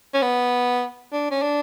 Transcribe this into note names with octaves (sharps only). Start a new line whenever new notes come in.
C#4
B3
D4
C#4
D4